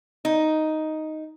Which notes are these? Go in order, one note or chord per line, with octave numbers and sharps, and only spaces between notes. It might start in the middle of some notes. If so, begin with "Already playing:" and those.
D#4